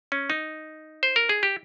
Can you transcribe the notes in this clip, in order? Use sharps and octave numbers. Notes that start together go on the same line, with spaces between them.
C#4
D#4
C5
A#4
G#4
G4